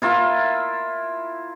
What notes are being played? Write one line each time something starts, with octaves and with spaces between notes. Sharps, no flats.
E4 F4 A#4 E5